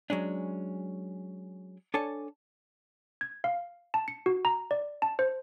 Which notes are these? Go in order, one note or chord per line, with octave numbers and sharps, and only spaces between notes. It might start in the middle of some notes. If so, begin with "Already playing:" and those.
F#3 G#3 C#4 D4
D4 A4 C#5 G#5 A5
G#6
F5
A5
C#7
F#4
A#5
D5
A5
C5